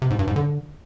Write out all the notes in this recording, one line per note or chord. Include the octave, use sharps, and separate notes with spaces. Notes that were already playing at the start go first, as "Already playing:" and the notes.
C3
G#2
G2
G#2
D3